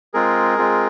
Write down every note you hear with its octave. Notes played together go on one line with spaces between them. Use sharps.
G#3 C4 F4 G#4 A#4
G#3 C4 F4